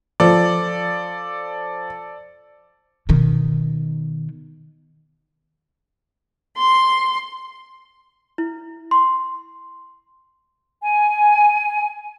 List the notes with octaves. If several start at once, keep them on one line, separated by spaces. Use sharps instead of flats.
F3 A4 D5
B2 D#3
C6
E4
C6
G#5